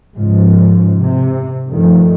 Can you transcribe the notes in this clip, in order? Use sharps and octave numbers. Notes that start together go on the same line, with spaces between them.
G#2 C#3 F3
C3
G2 D#3 F3 A3